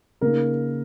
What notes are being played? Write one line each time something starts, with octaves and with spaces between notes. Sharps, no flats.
C#3 A#3 D#4 A#4